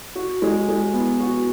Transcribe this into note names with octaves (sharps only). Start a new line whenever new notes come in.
F#4
G#3
G#3
B3
F#4